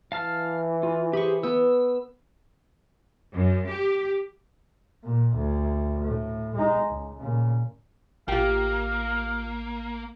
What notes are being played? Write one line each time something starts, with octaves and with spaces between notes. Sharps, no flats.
E3 F5 A5 F6
F4
G4 G#4 C5 B5 C#6
B3 E6
F#2
G4
A#2
D2
A2
G#3 D#4
C#2
A#2 C#3
A1 A#3 F4 G4 F5